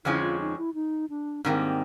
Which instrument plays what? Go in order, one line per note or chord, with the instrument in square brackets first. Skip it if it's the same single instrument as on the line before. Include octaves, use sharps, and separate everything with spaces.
[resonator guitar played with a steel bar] F2 D3 F3 G#3 C#4 [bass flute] E4
[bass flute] F4
D#4
E4
D#4
D4
[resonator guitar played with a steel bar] G#2 D#3 G3 A#3 [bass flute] C4